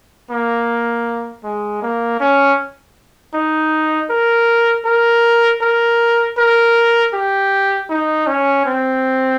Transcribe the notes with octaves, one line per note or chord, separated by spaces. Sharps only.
A#3
G#3
A#3
C#4
D#4
A#4
A#4
A#4
A#4
G4
D#4
C#4
C4